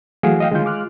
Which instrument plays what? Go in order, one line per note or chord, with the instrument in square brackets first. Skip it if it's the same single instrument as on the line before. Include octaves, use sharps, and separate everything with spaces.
[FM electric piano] E3 F#3 A3 [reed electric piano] G#4 F5 F#5
[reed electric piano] D#5 F5 G5
[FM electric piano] D3 D#3 G6 [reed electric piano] G#3 F4
[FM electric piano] D6 F6 F#6